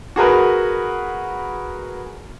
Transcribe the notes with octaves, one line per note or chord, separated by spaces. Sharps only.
F#4 G#4 A#4 B4